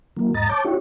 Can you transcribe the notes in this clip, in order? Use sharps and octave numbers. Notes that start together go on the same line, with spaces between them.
E3 F#3 A#3
E2 G#2 D#5 A#5 A6
C#5 A5 D6 G6
D4 E4 F#4 G4 C#5